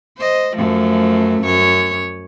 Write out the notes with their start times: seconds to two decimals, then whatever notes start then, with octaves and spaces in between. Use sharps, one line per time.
0.17 C5 D#5
0.56 F#2 F3 A3
1.43 F#2 C#5